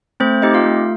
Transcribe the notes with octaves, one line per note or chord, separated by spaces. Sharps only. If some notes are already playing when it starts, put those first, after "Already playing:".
A3 C4 C5
C4 D#4 G4 D#5
F4 F5
A3